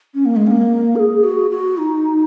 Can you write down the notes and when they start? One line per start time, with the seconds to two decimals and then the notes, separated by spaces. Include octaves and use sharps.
0.14 C#4
0.25 A#3
0.36 G#3
0.46 C#4
0.50 A#3
0.95 A#4
0.99 G#4
1.23 F#4
1.50 F#4
1.77 D#4